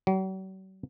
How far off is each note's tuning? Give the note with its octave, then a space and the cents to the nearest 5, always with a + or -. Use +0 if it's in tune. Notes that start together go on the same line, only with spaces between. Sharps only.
F#3 +45